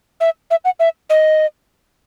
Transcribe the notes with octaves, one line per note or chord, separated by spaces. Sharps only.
E5
E5
F#5
E5
D#5